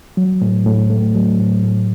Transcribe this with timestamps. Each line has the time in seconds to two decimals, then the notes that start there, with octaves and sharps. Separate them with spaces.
0.17 F#3
0.41 A2
0.66 A2
0.90 A3
1.15 F#3
1.40 A2
1.64 A2